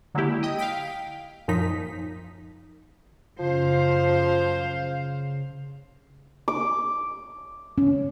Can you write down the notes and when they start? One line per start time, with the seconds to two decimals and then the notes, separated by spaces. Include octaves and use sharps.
0.15 D3 F#3 G#3 A#3 E4 G4
0.43 D#5 G5 D#6
0.59 F5 G5 B6 D7
1.48 F#2 A#2 F3 D#4 B6
3.39 F#2 C#3 F3 C5 F5
6.48 D6
7.78 C#4